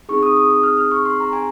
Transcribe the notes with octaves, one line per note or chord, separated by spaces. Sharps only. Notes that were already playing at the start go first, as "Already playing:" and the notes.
C4 D#4 G#4 C#6
D#6
D#6
D#6
F6
F6
C#6
C6
A#5
G#5